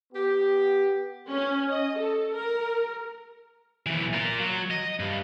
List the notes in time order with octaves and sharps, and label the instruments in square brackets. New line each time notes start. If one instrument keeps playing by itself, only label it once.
[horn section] B3 G4
[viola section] C#4
D#5
A4
A#4
[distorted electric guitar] B1 E3
F4 A#4
F#3
D#5
G2